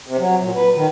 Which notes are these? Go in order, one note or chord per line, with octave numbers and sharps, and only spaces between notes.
C3
F#3
A#2
B4
D#3